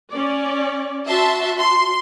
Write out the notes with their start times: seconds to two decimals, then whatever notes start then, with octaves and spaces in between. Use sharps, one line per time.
0.11 C#4 D5
1.08 F#4 E5 A5 C6
1.60 C6